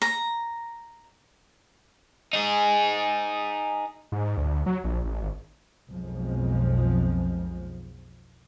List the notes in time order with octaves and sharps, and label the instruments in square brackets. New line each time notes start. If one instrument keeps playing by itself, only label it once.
[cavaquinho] A#5
[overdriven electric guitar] D#4 G#4
[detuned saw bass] G#2
D2
F#3
A#1
A1
G#1
[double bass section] B1 F2 F3 G#3